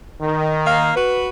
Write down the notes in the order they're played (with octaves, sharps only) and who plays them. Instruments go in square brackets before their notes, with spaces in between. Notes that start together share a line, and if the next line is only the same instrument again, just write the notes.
[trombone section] D#3
[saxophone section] A#3 F5
F#4 B4